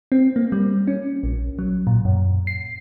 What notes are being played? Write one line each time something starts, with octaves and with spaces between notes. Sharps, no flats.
C4
A#3
G3
C#4
A#1
F#3
A#2
F#2
C7